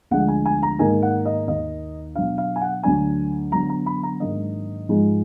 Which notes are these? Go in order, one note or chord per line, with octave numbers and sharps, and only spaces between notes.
D2 D3 F3 G#3 D4 F#5
G#5
G#5
A#5
G#2 D#3 A#3 D#4 G#5
F#5
D#5
D#2 D#3 A#3 D#5
B2 F#3 D4 F5
F5
G#5
F#5
D2 D3 F#3 D4 G#5
D3 F#3 B3 D4 A#5
A#5
B5
A#5
G#2 D#3 F#3 A#3 D4 D#5
G#2 F3 G#3 D#4